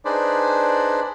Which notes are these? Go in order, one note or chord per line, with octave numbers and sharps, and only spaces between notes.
D4 D#4 G#4 B4 C5 D5